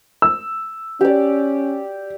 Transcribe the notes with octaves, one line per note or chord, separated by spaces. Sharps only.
E6
C#4 G4 D5